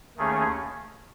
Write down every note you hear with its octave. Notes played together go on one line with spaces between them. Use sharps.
D#2 D#3 A3 C#4 G#4